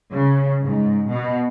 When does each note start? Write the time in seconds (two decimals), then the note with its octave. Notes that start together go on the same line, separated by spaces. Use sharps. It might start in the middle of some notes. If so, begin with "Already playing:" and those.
0.11 C#3
0.63 G#2
1.08 B2